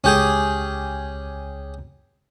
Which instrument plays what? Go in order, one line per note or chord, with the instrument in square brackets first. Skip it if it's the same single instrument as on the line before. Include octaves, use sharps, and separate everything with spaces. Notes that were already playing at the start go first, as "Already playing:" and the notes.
[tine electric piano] C#2 G6 [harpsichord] C#4 G4 G#4